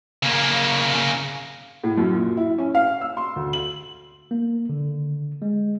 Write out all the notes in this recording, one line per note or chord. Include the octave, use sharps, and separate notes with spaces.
C#3 A#3
A2
F#2
A#2
E4
C#4
F5
E6
C6
D2
F#7
A#3
D3
G#3